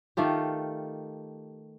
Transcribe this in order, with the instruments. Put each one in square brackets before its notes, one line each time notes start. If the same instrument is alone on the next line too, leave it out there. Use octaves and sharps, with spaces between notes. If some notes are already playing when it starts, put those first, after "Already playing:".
[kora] D#3 A3 F4 G4